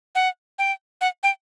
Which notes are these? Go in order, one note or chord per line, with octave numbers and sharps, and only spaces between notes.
F#5
G5
F#5
G5